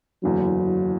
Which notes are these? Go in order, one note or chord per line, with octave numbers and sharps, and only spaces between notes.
F#1 E2 D3 F#3